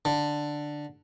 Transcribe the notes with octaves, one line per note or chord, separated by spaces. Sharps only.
D3